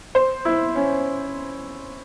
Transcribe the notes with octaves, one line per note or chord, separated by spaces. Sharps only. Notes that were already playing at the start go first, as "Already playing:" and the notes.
C5
E4
C#4